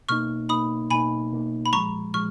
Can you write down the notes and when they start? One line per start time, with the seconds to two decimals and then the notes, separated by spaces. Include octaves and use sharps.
0.09 B2 A#3 D#4 C#6 F6
0.49 B2 A#3 D#4 B5 D#6
0.91 B2 A#3 D#4 G#5 B5
1.32 B2 A#3 D#4
1.66 B5
1.73 A#2 F3 G#3 A#5 C#6
2.14 A#2 F3 G#3 C#6 F6